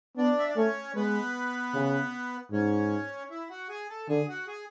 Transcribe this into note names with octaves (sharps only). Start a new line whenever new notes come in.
B3 D4 D5
E5
D5
A3 C#4 C#5
G#3 B3 B4
C#3
G#2 C#4 C#5
E4 E5
F#4 F#5
G#4 G#5
A4 A5
D3 G#4 G#5
F#4 F#5
G#4 G#5